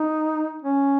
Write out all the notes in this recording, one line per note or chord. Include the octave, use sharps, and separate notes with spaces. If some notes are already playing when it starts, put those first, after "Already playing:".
Already playing: D#4
C#4